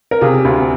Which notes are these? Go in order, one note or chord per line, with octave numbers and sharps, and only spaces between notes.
A#4
C3 F4 G#4
D2